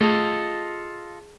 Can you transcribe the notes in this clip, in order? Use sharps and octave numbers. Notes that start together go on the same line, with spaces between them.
A3 F4 G#4 A4 D#5 A5